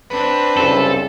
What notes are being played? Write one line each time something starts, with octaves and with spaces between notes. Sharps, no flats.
C4 D4 B4
C2 F#2 C#3 A4